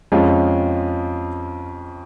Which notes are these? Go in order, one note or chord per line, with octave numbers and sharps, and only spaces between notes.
F2 F3 G#3 C#4 F4